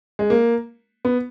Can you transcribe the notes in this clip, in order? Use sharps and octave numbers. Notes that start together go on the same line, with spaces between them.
G#3
A#3
B3